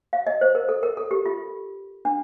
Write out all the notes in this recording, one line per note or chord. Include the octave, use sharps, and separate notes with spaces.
F5
D#5
C5
A#4
A4
A#4
A4
G4
F4
D4